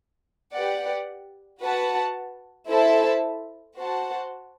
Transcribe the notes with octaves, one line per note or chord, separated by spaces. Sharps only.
G4 B4 D5 F#5
F#4 B4 F#5 A5
E4 A4 C5 E5 A5
F#4 C5 F#5 A5